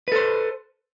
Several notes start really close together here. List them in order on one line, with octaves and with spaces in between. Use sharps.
B4 A4 C5